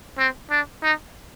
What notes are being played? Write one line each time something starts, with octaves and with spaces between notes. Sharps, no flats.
C4
D4
D#4